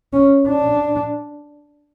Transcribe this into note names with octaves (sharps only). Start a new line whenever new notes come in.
C#4
D4